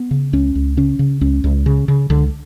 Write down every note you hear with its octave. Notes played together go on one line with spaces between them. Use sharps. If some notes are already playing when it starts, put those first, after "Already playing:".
Already playing: B3
C#3
C#2 C#4
C#2
C#3 C#4
C#3
C#2 C#4
C#2
C#3
C#3
C#2 D3